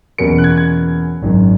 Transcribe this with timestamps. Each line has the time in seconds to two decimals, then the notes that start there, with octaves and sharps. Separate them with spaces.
0.18 E2 B2 A#3 C#4 C#7
0.38 F#6
0.44 G#6
0.57 G#6
1.22 G#1 F#2 D#3